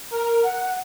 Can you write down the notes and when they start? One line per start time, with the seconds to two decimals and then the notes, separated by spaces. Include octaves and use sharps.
0.11 A#4
0.43 F#5